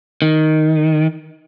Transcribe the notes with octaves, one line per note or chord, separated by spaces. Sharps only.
D#3